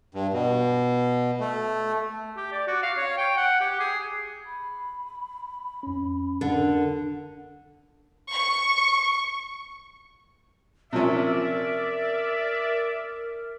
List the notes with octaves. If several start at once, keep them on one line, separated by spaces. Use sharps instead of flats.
G2
B2
A3
G4
D5
F#4
F5
C#5
G5
F#5
G4
G#4
B5
F2 C#4
D3 A#4
C#6
C3 F3 C#4 A#4 D5 E5